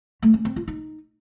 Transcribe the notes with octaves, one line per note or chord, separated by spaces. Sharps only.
A3
C#4
C4
F4
D#4